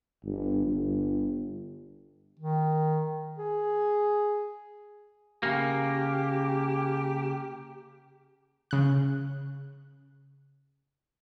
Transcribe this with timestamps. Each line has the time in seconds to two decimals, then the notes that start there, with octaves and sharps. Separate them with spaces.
0.24 G1
0.66 G1
2.40 D#3
3.38 G#4
5.43 C#3 A#3 G4
8.71 C#3 F#6